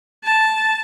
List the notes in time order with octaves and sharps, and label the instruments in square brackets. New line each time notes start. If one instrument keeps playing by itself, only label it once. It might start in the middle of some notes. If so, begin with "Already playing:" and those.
[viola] A5